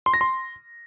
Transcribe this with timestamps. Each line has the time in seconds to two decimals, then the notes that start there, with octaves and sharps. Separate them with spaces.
0.06 C6
0.14 A#6
0.21 C6